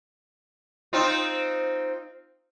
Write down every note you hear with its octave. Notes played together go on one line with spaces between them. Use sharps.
C4 D#4 F4